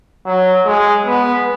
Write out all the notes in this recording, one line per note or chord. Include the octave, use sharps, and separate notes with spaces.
F#3
G#3
B3